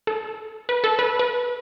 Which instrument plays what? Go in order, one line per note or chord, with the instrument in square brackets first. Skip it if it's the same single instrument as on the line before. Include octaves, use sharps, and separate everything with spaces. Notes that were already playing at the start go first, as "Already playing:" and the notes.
[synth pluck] A4
B4
A4
B4
B4